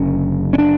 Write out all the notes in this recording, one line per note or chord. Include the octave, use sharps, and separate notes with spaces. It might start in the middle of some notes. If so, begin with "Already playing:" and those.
Already playing: F#1 F#2 D3 C#4
C#4
D4